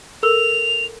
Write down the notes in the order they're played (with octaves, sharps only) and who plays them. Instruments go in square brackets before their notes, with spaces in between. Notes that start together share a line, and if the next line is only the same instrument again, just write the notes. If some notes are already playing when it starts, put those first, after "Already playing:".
[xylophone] A4 A#4 E6 [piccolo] F7